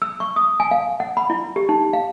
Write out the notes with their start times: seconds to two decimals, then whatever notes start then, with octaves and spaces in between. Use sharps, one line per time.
0.02 E6
0.20 C#6
0.36 D#6
0.60 G#5
0.71 F5
1.00 F#5
1.17 B5
1.30 E4
1.56 G4
1.69 D#4
1.93 F5